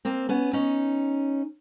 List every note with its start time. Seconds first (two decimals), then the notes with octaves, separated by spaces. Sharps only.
0.05 A#3 C4
0.29 B3 C#4
0.53 C#4 D#4